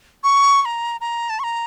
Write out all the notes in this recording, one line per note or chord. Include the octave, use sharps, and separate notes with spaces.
C#6
C#6
A#5
A#5
A5
C#6
A#5